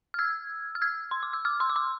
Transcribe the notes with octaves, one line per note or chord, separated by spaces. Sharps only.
F6
E6 G#6
F6
E6 G#6
C6
D6
E6
D6 F6
C6 E6
D6
C6 E6